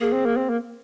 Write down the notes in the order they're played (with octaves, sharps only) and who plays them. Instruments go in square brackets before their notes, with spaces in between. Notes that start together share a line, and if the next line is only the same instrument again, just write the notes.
[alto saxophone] A#3 [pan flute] G#4
[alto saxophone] C4
A#3
C4
A#3